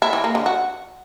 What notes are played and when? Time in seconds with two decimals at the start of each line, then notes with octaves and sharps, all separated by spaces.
0.02 E4
0.13 E3
0.24 A#3
0.35 D3
0.46 F#4